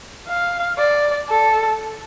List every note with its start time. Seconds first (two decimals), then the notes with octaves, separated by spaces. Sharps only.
0.28 F5
0.78 D5
1.29 A4